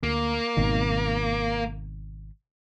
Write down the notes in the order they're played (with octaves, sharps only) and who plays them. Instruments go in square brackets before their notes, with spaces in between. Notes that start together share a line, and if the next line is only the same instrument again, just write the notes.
[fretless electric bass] D2 [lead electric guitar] A#3
[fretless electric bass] G#1 B2 D#3